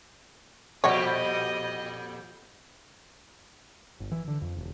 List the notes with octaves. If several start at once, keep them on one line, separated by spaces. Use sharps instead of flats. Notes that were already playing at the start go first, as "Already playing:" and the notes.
F2 A#2 G3 F#4 G4 C#5 D#5
G1
E3
D3
F2
E1